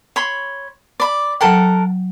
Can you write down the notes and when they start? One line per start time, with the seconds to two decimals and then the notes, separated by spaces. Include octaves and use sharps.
0.16 C#5 B5 C6
1.00 D5 B5
1.41 F#3 A4 A#4 F#5 G5